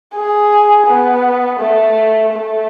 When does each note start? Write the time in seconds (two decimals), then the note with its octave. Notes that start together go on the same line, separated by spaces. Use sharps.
0.15 G#4
0.87 B3
1.60 A3
2.33 A3